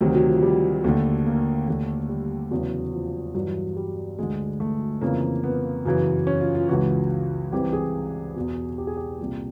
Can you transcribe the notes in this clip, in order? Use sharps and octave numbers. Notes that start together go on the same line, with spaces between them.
D2 C3 D#3 F#3
F#3
F3
G3
D#2 D3 A3
A#3
D#2 D3 A3
G3
E2 C#3 E3 F#3
F3
G2 E3 F#3
G3
D2 D3 G#3
A3
F2 C#3 E3 A#3
B3
F#2 C#3 E3
C#4
F4
F4
C#2 C#3 E3 F#4
C2 C3 E3 G4
G#4
E2 B2
G4
G#4
G4
C2 A#2